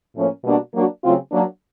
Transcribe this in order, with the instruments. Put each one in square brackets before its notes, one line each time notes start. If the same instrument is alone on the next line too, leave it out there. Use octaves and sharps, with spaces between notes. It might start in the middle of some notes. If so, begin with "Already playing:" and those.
[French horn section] A2 F3 A#3 C#4
B2 G3 A#3 D4 F#4
F#3 A#3 D4 F#4
C#3 F#3 A3 C4 F4
F#3 A#3 D4